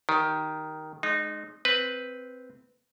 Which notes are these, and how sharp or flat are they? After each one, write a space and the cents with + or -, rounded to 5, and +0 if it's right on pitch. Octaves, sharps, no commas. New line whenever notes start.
D#3 +0 G4 -15
G#3 +20 D#4 -25
C4 -5 B4 +0